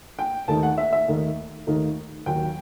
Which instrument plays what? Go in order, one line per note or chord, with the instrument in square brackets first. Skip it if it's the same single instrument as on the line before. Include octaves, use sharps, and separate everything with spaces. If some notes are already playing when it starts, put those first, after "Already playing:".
[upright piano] G5
D#2 D#3 A3 D#4 A5
F#5
E5
E5
D#2 D#3 A3 D#4
D#2 D#3 A3 D#4
D#2 D#3 F#3 G5